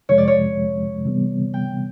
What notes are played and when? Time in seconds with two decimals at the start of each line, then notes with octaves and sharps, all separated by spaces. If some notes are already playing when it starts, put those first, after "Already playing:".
0.09 F2 C3 F3 G#3 C#5
0.18 D5
0.28 C#5
1.05 C3 E3 G3 B3
1.54 G5